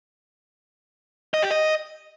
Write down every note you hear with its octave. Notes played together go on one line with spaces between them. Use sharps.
D#5
G4
D#5